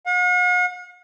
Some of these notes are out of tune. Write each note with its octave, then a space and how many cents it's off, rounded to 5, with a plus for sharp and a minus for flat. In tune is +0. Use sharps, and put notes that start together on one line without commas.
F#5 -45